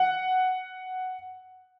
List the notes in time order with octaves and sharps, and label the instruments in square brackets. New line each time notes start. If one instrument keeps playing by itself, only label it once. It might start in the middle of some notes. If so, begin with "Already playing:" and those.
Already playing: [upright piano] F#5